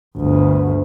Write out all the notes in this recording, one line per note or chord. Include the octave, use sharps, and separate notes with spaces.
G1 D2